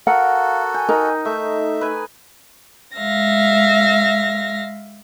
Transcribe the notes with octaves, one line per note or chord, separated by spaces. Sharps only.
F#4 A4 A#4 F5 F#5
G5 G#5
D#4 A#4
A3 D#4 E5
B4 G#5
G#3 E5 F5 A#6